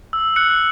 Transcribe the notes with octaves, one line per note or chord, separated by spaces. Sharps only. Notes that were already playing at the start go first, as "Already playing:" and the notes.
E6
F#6 C#7